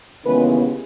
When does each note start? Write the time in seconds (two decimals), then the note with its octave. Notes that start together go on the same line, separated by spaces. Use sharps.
0.25 D#2 C#3 E3 G#3 B3 B4